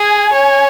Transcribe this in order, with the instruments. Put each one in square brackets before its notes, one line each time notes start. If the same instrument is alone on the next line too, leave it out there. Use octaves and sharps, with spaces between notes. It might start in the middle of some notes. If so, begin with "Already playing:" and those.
Already playing: [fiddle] G#4 [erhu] G#5
[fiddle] C#5